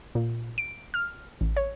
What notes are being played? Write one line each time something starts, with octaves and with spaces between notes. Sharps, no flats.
A#2
D7
F6
A1
C#5